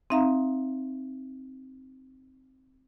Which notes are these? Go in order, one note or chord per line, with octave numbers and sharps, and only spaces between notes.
C4 D#4 E5 F5 A#5